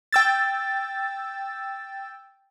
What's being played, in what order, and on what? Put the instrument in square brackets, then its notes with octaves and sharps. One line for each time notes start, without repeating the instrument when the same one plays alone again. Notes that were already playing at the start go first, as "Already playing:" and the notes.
[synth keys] G5 E6 A6